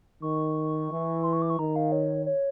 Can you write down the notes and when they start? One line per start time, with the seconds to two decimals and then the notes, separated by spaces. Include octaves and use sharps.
0.22 D#3 C#6
0.91 E3
1.24 C6
1.33 C#6
1.42 D6
1.50 C#6
1.58 D#3 A#5
1.76 F5
1.92 C#5
2.26 C#5